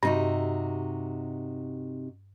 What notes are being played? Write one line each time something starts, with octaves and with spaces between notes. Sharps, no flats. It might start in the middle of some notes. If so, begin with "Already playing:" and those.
G2 C3 D#4 F#4